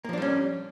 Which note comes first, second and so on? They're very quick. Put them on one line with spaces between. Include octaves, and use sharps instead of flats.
A#3 F3 D4 G3 C#4